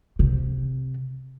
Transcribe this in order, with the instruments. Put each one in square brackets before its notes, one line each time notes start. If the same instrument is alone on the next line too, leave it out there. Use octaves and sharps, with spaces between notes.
[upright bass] C3